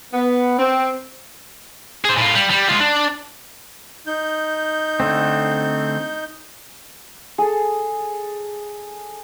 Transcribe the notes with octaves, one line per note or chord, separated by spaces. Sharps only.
B3
C4
G#4 C5
A2 F4
G3
G3
G#3 F4
D4
D#4 G6
D3 A3 C4
G#4 A4